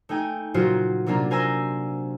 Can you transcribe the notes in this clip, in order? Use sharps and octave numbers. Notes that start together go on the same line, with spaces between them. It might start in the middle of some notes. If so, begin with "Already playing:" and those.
A3 D#4 G5 G#5
A#2 C#3 F#3 F4 F#4 C5
C3 F#3 A#3 D4 F4
A#4 C5 G#5 C6 E6 A#6